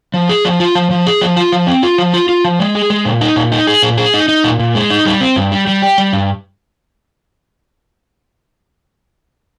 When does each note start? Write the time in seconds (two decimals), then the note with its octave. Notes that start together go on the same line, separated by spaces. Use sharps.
0.14 F3
0.29 G#4
0.45 F3
0.60 F4
0.75 F3
0.90 F3
1.06 G#4
1.21 F3
1.36 F4
1.52 F3
1.67 C4
1.83 F4
1.98 F3
2.14 F4
2.29 F4
2.44 F3
2.60 G#3
2.75 G#4
2.90 G#3
3.05 A#2
3.21 D#4
3.36 A#2
3.52 D#4
3.67 G#4
3.83 A#2
3.97 G#4
4.14 D#4
4.28 D#4
4.44 A#2
4.59 A#2
4.75 G#3
4.90 D#4
5.05 G3
5.21 C4
5.36 G2
5.52 G3
5.67 G3
5.82 G4
5.98 G3
6.13 G2